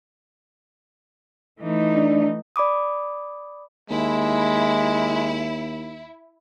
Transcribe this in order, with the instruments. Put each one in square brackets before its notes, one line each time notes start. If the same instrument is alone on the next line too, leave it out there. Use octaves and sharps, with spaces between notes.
[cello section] E3 A3 D#4
[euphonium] D4
[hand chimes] D5 B5 D6 D#6
[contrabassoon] D#2 [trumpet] G#3 [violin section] E4